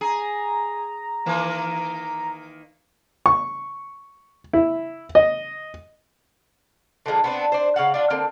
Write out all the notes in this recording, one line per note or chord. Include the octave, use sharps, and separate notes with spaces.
G#4 A#5
D#3 E3 A#3
C#6
E4
D#5
D3 F3 G#3 A#3
B3 C4 D4
D4 C5
C#3 F5 F#5
D4 F4 D5
D3 A#3 C4